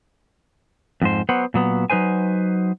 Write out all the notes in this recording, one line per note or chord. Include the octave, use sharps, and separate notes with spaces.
F2 G#2 C5
F#3 B3 C5 F#5
A#2 F#3 B3
F#3 D#4 B4 C5 G#5